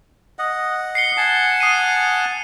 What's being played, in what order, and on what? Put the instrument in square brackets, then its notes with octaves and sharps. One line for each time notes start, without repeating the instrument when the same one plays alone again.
[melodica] D#5 F#5
[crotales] C7 C#7 G7
[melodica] F#5 G#5 A5
[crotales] D#6 C7 D#7